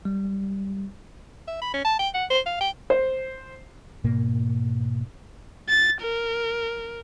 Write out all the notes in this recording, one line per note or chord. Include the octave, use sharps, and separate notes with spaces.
G3
E5
B5
C#4
A5
G5
F#5
C5
F5
G5
C5
G#2 B2 A#3
A6
A#4